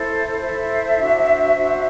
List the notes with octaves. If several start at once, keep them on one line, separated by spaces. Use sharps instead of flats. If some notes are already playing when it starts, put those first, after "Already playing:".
Already playing: E4 A4 C5
E4 A4 C5 E5
D4 F#4 C5
D4 F#4 C5